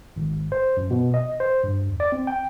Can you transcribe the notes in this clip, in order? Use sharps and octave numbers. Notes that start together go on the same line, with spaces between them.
G#1
C5
F#2
B2
D#5
C5
G2
E2
D5
C4
G5